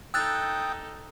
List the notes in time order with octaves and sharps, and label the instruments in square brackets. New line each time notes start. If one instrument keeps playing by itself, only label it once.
[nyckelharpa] D#4 A4 [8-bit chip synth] G5 D#6 G6 [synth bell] E6 F#6 A6